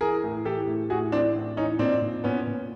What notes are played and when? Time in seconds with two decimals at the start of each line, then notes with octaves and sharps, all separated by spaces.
0.01 E3 G#4 A#4
0.24 A2
0.45 E3 G4 A4
0.67 A2
0.90 A2 F#4 G#4
1.12 E3 C4 D4
1.35 A2
1.57 E3 C#4 D#4
1.79 A#2 C4 D4
2.02 A#2
2.24 A#2 B3 C#4
2.47 A#2